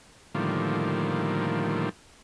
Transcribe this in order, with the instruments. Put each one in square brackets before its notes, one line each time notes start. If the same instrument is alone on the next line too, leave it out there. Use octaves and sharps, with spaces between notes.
[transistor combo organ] A2 D3 D#3 F3 G3 A#3